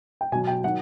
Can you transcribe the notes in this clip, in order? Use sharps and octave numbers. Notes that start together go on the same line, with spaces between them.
G5
B2 F#3 G#5
G5
D#3 F#3 F#5